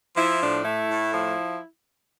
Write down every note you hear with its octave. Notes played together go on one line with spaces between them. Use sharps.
F3 E4
A2 D4
A3 E4
A2
F3